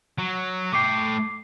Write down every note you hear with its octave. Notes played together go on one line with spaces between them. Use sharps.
F#3
A3 G5 D6 C7